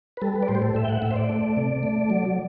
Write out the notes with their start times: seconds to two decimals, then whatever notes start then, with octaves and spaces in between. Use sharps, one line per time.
0.17 B4
0.22 G3 A4
0.36 B4
0.43 D5
0.48 A2 C5
0.55 G4
0.62 A4
0.75 A2 E5
0.84 G5
0.89 F#5
1.02 A2 E5
1.11 C5
1.16 D5
1.30 A3
1.57 C3
1.83 A3
2.10 F#3